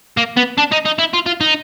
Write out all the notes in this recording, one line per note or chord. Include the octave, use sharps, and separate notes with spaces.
A#3
B3
D4
D#4
D#4
E4
F4
F4
D#4